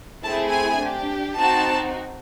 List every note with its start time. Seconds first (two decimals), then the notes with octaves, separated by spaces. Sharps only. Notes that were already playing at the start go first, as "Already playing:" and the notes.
0.22 A3 C4 E4 G#4 A5
0.51 G#5
0.80 D4 G4
1.36 C4 D#4 F#4 A5